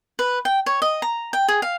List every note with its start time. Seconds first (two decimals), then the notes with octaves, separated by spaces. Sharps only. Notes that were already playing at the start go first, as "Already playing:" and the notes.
0.19 B4
0.45 G5
0.66 C#5
0.82 D#5
1.02 A#5
1.33 G5
1.48 G#4
1.62 F5